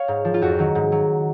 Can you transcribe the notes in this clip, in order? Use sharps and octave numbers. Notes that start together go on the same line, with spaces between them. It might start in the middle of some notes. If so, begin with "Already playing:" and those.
Already playing: C#5 F5
G#2
F3
F4
F2 F#4
D#3 F#3
G#2
F#3